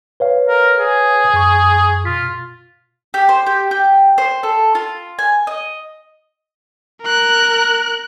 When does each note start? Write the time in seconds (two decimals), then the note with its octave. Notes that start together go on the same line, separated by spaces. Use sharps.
0.20 B4 C#5 F5
0.47 A#4
0.79 G#4
1.34 F#2 C#6
2.05 B2 F4 B6
3.14 G4
3.29 C5
3.46 G4
3.71 G4
4.18 C5
4.43 A4
4.75 F4
5.19 G#5
5.47 D#5
7.02 A#4 F#6